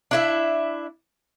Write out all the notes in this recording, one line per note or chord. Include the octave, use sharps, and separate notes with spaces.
D4 E4 E5